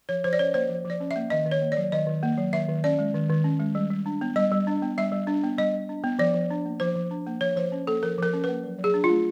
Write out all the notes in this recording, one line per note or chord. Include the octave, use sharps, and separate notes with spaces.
F3 C#5
F3 C5
D5
C#4 C#5
A#3 C5
F3
F3
D5
C#4
E5
A#3
D#3 D#5
D#3
C#5
A#3
D5
F#3
D#3 D#5
D#3
A#3
F#3
D#3 E5
D#3
C#4 D5
G#3
D#3
D#3
C#4
G#3
G3
G3
D4
B3
G3 D#5
G3
D4
B3
G3 E5
G3
D4
B3
G3 D#5
G3
D4
B3
F3 D5
F3
D4
A#3
F3 C5
F3
D4
A#3
F3 C#5
F3 C5
C#4
A#3 A4
F3 A#4
F3 A#4
C#4
B4
A#3
F#3
F#3
G#4
D4
F4
A3